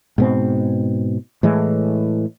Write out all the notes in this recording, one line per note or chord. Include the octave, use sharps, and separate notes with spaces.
G#2 B2 C4
A2 E3 G#3